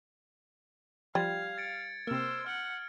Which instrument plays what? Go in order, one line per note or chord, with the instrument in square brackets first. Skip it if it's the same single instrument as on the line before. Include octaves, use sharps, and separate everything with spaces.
[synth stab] F3 [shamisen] G3 [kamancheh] F5 [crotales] G#6
[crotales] A6 C#7 D7
[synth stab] C3 A#3 [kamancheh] C5 E6 [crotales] F6
[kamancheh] F#5 [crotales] F6